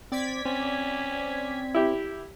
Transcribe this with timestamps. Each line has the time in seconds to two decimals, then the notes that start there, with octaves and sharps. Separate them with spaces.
0.12 C4 D5 G#6 B6
0.45 C4 C#4
1.75 E4 G4